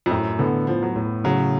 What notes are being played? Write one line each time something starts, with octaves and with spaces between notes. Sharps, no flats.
F2
F#2 A2
D3 B3
F3 B3
F#3
A2
C#3 F#3